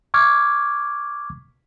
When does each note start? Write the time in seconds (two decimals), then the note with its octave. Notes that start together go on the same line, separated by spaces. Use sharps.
0.14 C#6 D6 F6 G#6